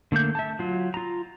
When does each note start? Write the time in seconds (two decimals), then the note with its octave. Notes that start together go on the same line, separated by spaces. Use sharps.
0.12 D3 A3 A#3 G6
0.35 E5 A5
0.59 F#3 F4
0.94 F4 A#5